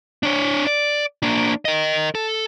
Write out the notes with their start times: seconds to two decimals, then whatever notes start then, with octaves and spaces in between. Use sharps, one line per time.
0.23 D4 C#5
0.67 D5
1.23 A#3 D4
1.65 A#4 D#5
2.15 A4